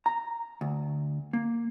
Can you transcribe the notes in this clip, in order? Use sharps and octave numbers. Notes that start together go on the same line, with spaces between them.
A#5
D2
A#3